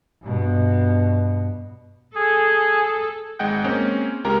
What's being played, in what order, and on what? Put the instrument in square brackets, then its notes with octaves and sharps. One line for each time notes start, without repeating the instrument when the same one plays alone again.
[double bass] G2 B2
[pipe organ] G#4 [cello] A4
[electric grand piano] G#1 G#3 D#5 F#5 G5 G6
G#3 A#3 C4 C#4
C#2 G#3 G4 A#4 A#5